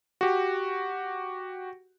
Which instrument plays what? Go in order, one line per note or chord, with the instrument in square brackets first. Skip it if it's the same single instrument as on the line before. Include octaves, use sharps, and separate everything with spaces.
[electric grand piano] F#4 G4